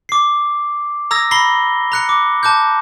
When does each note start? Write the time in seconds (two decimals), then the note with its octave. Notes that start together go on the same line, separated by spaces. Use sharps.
0.09 D6 C7
1.11 A#5 D#6 E6 G#6 A#6
1.31 A#5 B5 A#6 C7 G7
1.92 A#5 F#6 C#7
2.09 D6
2.43 A5 D6 F#6 G6